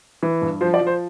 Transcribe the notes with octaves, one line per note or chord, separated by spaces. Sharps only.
E3
G2
F3 C5
D5
F3
C5